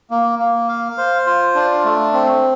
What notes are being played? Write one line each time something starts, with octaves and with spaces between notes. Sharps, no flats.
A#3
A#3
F5
C5
F4
D4
A3
C4